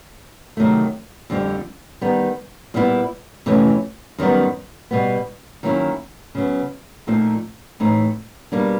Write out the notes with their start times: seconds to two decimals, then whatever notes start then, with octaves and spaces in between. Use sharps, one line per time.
0.57 C3 D#3 F#3 A3
1.30 F2 D3 G3 C4
2.01 D#3 G3 B3
2.74 A#2 G3 B3 E4
3.46 F2 C3 E3 A3 C#4
4.18 F#2 D#3 G3 B3
4.91 B2 G3 B3
5.63 D#3 F#3 A#3 C#4 E4
6.35 C#3 F#3 B3
7.07 A#2 F3 A3 C4 D#4
7.80 A2 E3 A3 C4 D#4
8.52 B2 G3 A#3 D4